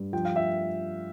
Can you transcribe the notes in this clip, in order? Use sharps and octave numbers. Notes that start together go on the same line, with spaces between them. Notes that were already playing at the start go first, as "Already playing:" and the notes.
Already playing: G2
F3 G5
F5
F3 E5